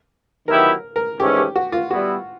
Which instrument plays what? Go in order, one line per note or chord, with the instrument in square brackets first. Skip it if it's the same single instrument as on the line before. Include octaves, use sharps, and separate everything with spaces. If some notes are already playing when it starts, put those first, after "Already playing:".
[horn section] D#3 F#3 B3 E4 G4 [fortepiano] A#4
[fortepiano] A#4
[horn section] G#2 E3 A3 C#4 [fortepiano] G4
[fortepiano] G4
F#4
F4
[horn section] G3 B3 E4 [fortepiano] F#4